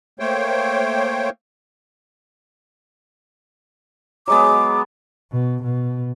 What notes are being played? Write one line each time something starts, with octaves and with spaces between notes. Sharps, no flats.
A3 A#3 C5 C#5 G5
F#3 G#3 B3 D6
B2
B2